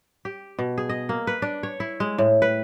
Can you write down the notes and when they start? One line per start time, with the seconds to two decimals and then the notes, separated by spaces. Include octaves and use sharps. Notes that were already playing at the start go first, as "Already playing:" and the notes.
0.25 G4
0.59 B2
0.78 G#4
0.89 D#5
1.09 A#3
1.27 B4
1.42 D4
1.63 C#5
1.80 E4
2.00 G#3
2.18 A2
2.42 B4